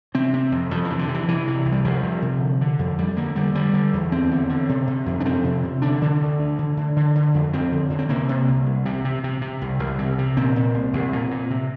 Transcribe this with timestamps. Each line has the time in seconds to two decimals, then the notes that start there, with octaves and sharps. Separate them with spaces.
0.15 C3 C4
0.33 C3
0.52 F2
0.71 F2 F3
0.85 E3
0.90 C3
0.99 D3
1.09 C3
1.14 E3
1.28 C3 E3
1.47 C3
1.65 C2
1.72 G3
1.84 C2 F3
2.03 C3
2.22 C3
2.41 D3
2.61 D3
2.79 F2
2.98 F2 G3
3.17 D3 A#3
3.36 D3 G3
3.55 D3 G3
3.73 D3
3.93 E2
4.12 E2 C4
4.31 D3
4.49 D3
4.69 C3
4.88 C3
5.06 F2
5.20 D4
5.25 F2 C4
5.45 C3
5.63 C3
5.82 D3 D4
6.02 D3
6.20 D2
6.39 D2
6.59 D3
6.77 D3
6.96 D3
7.15 D3
7.34 F2
7.53 F2 C4
7.72 D3
7.90 D3
7.99 C4
8.09 C3 A#3
8.29 C3
8.48 C2
8.66 C2
8.85 C3
9.05 C3
9.24 C3
9.41 C3
9.62 C2
9.79 C2
9.99 C3
10.18 C3
10.37 A#2 C4
10.56 A#2
10.74 C2
10.93 C2
11.13 A#2
11.31 A#2
11.50 C3